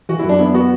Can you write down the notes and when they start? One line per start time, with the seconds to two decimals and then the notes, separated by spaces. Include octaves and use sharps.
0.09 E3 F#4
0.19 E4
0.24 F#2 D4
0.39 B3 E4
0.54 B3 F#4